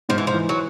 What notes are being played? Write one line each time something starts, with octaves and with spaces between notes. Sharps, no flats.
G#2 F3
E3
F3
E3
F#3